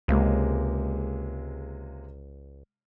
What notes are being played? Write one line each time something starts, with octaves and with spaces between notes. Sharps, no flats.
C#2 C3 G#3 A#3